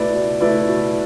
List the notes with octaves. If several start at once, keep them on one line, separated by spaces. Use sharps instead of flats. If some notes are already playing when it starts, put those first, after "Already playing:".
Already playing: B2 A3 E4 B4 D5
B2
A3 E4 B4 D5
B2